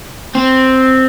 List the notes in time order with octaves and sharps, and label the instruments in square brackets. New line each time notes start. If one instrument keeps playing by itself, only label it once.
[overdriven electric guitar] C4